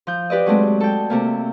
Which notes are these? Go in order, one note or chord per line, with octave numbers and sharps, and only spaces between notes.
F3 G6
G4 B4 D5 D#5
F#3 G#3 A3 C4
A4 G5
C3 A3 A#3